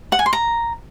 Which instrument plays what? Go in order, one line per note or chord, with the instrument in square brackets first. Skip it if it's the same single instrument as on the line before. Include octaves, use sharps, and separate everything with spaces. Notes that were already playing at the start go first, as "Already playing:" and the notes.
[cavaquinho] F#5
G#5
C6
A#5